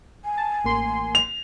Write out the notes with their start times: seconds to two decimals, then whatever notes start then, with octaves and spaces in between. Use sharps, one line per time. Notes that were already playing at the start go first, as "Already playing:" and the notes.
0.25 G#5
0.38 A5
0.64 A1 A#3 C6
1.15 F7